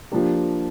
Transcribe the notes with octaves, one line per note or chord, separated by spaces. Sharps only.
F3 A#3 D4 G4